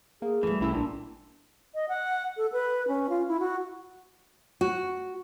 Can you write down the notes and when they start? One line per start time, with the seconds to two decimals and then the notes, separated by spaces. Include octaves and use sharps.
0.22 A#3 G#4
0.43 F#2 E3 G3 A3
0.60 C2 A2 C#4 E4 E6
0.73 A1 A#2 D4
1.75 D#5
1.89 F#5
2.37 A4
2.52 B4
2.88 C#4
3.09 F4
3.28 E4
3.40 F#4
4.61 F#4